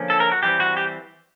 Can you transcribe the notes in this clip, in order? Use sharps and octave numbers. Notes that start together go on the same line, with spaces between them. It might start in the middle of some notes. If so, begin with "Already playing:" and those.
Already playing: D3 F3 A#3 C#4
A4
A#4
F#4
E3 G3 C4 G4
F#4
G4